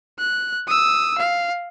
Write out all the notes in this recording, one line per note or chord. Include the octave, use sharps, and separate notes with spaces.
F#6
D#6 E6
F5